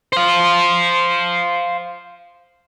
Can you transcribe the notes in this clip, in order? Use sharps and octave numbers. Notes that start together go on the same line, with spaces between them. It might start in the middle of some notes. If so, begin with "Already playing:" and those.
C5 F5